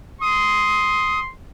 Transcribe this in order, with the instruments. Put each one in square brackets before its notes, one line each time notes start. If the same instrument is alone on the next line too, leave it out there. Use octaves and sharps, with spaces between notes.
[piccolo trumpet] C6 [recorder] D#6